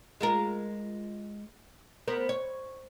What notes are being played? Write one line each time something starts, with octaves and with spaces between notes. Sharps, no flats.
G#3 F4 A#4
B3 A#4 C5
C#5